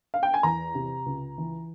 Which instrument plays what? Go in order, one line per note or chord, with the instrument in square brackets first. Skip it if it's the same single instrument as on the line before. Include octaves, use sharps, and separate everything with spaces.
[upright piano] F5
G5
G#5
E2 A#5
C3
C#2
E3